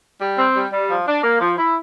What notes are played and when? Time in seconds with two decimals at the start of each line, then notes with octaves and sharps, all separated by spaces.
0.20 G3
0.38 C4
0.55 G3
0.72 G3
0.89 F3
1.07 D4
1.24 A#3
1.40 F3
1.58 E4